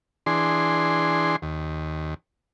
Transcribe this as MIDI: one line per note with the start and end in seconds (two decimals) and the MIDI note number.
0.26 1.36 52
0.26 1.36 62
0.26 1.36 68
0.26 1.36 84
1.42 2.14 39